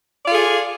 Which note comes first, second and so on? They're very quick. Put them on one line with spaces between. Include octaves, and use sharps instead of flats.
D5 F4 A4 G#4